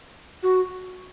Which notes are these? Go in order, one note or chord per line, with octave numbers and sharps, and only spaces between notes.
F#4